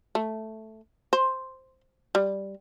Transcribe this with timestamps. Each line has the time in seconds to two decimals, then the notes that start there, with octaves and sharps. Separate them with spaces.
0.15 A3
1.13 C5
2.15 G3